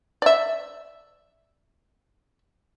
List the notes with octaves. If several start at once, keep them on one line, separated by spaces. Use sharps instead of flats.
D5 E5